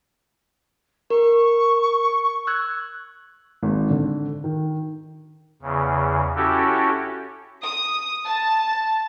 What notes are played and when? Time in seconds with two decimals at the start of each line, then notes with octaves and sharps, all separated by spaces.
1.10 A#4 C#6
2.47 E6 F#6 G#6
3.63 G#1
3.90 D3
4.44 D#3
5.62 E2 C#3
6.36 C#4 E4 F#4 G4 A4
7.63 D#6
8.26 A5